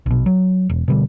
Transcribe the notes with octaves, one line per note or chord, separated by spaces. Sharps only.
A#1 B2
F#3
E1
B2 D3 G3